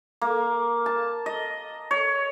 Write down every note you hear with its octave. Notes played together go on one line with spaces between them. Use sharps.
A#3
A5
D#5
C#5